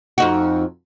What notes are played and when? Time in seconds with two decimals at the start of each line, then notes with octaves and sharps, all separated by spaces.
0.18 F2 D#4 F#4